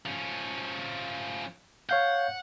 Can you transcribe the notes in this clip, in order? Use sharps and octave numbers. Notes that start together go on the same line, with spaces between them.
F3 C#4
C#5 F5 F#5 G6